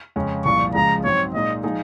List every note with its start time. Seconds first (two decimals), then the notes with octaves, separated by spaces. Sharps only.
0.16 F2 C#3 G#3 C#4
0.45 C2 A#2 F3 C#6
0.74 C#2 C#3 F3 G#3 A#5
1.04 G#2 F#3 C4 C#5
1.34 A#2 G#3 D#4 D#5
1.63 F3 G#3 D#4 G#4